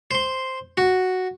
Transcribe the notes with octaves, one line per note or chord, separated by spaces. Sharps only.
C5 C6
F#4